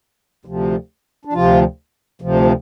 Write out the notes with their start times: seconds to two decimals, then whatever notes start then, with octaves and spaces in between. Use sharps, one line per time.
0.45 D2 C3 F3
1.25 D4
1.33 D2 C3 F3 F4
2.21 D2 C3 F3